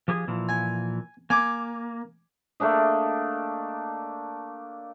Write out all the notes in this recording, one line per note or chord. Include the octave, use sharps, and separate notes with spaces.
F3 G4 G#4
A#2 E3 F3
G#5
A#3 G#5 D6
A3 A#3 D4 D#5